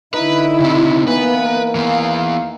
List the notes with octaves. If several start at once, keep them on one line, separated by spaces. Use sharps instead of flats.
D3 D#4 E4 B4
C#3 C4
E3 A#3 B3 B4
A#4
E3 B3 F5